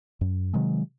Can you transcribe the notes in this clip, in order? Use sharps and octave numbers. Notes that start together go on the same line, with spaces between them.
F#2
C3 D#3 F#3 G#3